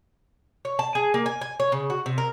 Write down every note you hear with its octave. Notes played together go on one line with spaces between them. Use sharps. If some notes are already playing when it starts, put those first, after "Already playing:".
C#5
A5
G#4
A#3
G#5
G#5
C#5
C#3
F#4
C3
A#4